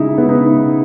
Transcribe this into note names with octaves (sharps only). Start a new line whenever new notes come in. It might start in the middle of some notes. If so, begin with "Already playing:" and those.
Already playing: C#3 G#3 D#4 E4
C#3 G#3 B3
D#4